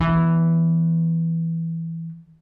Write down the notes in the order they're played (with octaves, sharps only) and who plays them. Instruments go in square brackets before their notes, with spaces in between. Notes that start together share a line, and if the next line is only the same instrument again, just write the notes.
[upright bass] E3 B3